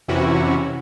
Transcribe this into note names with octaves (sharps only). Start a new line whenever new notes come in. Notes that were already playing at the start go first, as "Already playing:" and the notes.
F2 C3 E3 C#4 E4 F#4